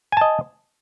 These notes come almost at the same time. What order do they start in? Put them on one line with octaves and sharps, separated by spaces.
G#5 A5 D#5